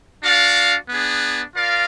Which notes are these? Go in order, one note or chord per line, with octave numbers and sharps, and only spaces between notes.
D4 F#4 D5 F5
B3 D4 G#4
F4 A#4 D5 F5